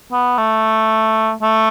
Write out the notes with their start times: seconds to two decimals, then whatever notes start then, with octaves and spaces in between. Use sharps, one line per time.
0.12 B3
0.38 A3
1.43 A3